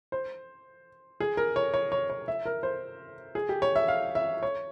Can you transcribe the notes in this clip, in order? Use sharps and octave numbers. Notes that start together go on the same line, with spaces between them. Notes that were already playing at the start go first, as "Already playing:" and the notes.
C5
G#4
A#4
C#5
C#5
C#5
C#5
E5
A#4
C5
G#4
G4
C#5
E5
F5
E5
C#5